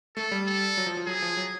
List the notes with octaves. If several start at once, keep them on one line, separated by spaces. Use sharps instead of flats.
A3 A4
G3
A4
F#3
F3
F3
F#3 G#4
F3
F#3